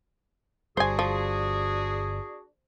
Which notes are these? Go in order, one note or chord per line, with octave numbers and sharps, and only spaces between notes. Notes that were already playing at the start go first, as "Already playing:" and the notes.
G1 G3 D4 F#4 G#4 C5 G#5
F3